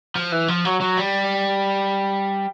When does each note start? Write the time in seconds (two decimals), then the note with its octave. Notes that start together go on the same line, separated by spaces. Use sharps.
0.15 F3
0.32 E3
0.48 F3
0.65 F#3
0.81 F#3
0.97 G3